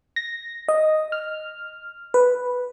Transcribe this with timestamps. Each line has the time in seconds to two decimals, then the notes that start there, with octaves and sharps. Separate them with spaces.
0.16 A#6
0.69 D#5
1.12 F6
2.14 B4